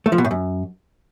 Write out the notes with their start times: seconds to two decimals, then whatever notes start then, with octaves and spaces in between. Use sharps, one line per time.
0.06 A3
0.12 F3
0.18 B2
0.24 A2
0.31 F#2